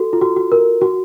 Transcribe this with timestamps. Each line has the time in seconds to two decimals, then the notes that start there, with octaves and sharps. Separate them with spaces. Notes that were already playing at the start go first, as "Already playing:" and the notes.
Already playing: F#4 A4
0.13 F4
0.21 F#4
0.36 F#4
0.52 A#4
0.81 F#4